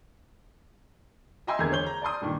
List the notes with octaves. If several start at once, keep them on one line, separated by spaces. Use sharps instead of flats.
D#5 E5 G5 G#5 C6 E6
E2 D3 A#4 G#6
E2 C#5 G6 G7
A#5
D5 A5 C6 D#6
G2 A#2 D#3